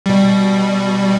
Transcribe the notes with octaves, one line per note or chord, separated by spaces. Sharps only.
B2 G3